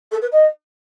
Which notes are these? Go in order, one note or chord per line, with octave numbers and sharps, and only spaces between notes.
A4
B4
D#5